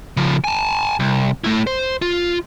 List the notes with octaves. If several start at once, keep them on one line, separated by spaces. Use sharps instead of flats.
C#3 F3
G#5 A5
C2
A3 E4
C5
F4